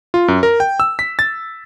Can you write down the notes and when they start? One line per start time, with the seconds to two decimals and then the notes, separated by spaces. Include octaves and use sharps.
0.14 F4
0.28 F#2
0.43 A#4
0.60 G5
0.80 E6
0.99 B6
1.19 A6